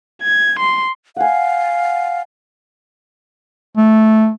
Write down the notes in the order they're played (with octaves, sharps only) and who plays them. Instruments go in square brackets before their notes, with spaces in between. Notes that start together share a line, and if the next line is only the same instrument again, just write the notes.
[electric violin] G#6
C6
[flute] F5 [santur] F#5 G#5
[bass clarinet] A3